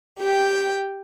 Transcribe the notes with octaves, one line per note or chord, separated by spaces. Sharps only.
G4 G5